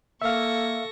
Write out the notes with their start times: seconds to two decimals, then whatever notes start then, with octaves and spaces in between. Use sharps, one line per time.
0.22 A#3 A4 E5 F5 C#6 A#6